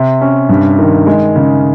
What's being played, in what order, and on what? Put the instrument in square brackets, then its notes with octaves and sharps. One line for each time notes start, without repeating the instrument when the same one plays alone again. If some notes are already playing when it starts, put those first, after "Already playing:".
Already playing: [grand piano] C3
C#4
G2
D#3
G#3
C#3